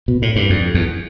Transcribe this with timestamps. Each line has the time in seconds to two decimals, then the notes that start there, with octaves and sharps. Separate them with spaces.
0.08 B2
0.22 A2
0.36 G2
0.50 F2
0.74 E2